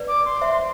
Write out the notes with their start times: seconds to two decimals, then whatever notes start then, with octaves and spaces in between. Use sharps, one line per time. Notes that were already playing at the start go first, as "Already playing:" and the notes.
Already playing: B4 D5
0.08 D6
0.25 C6
0.41 C5 E5 C6